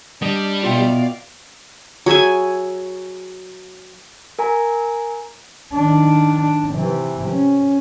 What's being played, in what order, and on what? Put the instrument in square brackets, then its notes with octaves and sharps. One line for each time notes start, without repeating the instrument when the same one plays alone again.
[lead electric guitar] G3 [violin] D4 [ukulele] D#5
[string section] B2 [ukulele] F4 E5 G5 [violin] D5 F5
[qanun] F#3 G#4 E5 G#5
[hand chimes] A#4 G#5 A#5
[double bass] D#3 D4
D4
C3 E3
C#4